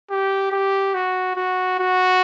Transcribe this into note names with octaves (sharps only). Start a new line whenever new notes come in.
G4
G4
F#4
F#4
F#4